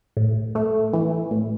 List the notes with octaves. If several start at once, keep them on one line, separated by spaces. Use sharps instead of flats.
A2
A3
E3
A2